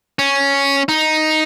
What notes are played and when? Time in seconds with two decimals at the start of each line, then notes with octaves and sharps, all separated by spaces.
0.19 C#4
0.89 D#4